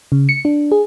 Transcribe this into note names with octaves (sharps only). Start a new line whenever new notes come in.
C#3
C#7
D4
G#4